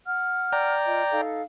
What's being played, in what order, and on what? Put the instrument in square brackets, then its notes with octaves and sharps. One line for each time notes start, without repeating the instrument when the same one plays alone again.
[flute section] F#5 F6
[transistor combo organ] D5 G5 A#5
[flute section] F4 D#5
D#4 A4 F5